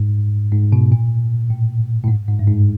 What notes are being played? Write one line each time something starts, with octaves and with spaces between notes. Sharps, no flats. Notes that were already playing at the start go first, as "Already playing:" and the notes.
Already playing: G#2
G#2
B2
A#2
A2
A2
G#2
G#2
G2
G#2